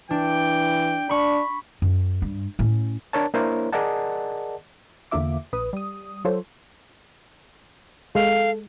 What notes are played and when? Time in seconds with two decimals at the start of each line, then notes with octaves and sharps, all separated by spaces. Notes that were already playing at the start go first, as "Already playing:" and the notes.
0.11 E3 D4 G5
1.09 D4 B5 C#6
1.82 F#2
2.22 G2
2.59 A2 C#4
3.13 D4 A#4 C#5 A5
3.34 A#3 D4 E4 A#4 C5 C#5
3.73 G#4 A#4 D5 D#5 F#5 A5
5.11 E2 D3 A#3 F4 E5 D6
5.53 A#1 B4 D#6
5.73 G3 D#6
6.25 F#3 F4 A4 C5 C#5
8.15 G#3 A4 F5